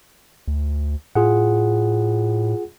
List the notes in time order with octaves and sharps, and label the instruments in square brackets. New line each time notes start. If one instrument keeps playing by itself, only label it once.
[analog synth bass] D2
[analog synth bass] A2 [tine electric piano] F4 G#4 F#5